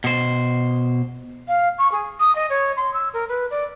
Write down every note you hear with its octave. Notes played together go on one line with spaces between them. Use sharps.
B2 C5
F5
C#6
G#4
D#6
D#5
C#5
C6
E6
A#4
B4
D5